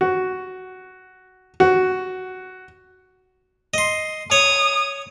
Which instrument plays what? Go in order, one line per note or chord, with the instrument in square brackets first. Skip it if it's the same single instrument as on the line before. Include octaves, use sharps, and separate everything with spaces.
[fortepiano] F#4
F#4
[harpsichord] D#5 C6
[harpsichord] C#5 [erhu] D#6